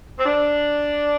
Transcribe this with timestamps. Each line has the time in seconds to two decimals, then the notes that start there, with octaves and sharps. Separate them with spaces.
0.19 C4
0.26 D4